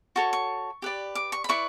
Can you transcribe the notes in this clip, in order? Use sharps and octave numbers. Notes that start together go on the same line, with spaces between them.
F#4 A4 C#5 C#6
C#6
G4 B4 D5
D6
C#6
B5
E4 B4 D5 C#6